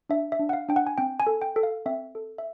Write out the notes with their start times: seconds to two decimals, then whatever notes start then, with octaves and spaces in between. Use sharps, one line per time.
0.10 D4 E5
0.32 E5
0.39 D4
0.49 F#5
0.53 F5
0.69 D4 G5
0.76 F#5
0.87 G#5
0.98 C4 G5
1.20 G#5
1.27 A4
1.42 G5
1.56 A4
1.63 F5
1.86 C4 E5
2.15 A4
2.38 E5